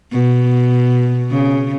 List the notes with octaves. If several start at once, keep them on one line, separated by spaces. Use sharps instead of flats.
B2
C#3